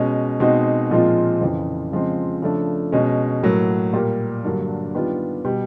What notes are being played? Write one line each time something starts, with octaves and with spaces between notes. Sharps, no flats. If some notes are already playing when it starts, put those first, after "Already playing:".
Already playing: B2 G#3 C#4
B2 G#3 C4 D#4 F#4
A#2 F3 G#3 C4 F4
F2 C#3 E3
C#3 F3 G#3 C4
C#3 F3 A3 D4
B2 G#3 C#4
A2 F#3 A#3
A#2 G3 A#3
G2 D3 F#3 A#3 D4
D#3 G3 B3 D4 F4
B2 G3